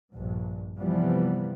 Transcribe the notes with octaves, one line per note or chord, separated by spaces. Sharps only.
A#1 G2
C3 E3 F3 G3 B3